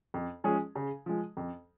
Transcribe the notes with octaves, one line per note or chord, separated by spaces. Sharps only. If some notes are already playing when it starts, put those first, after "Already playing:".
F2
F3 G#3 C#4 G#4
C#3
F3 G#3
F2